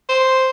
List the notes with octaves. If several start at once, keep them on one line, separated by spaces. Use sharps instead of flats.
C5